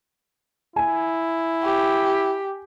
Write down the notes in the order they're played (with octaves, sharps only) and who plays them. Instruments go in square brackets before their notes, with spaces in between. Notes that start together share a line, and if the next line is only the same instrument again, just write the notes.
[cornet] E4 [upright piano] G#5
[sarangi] G4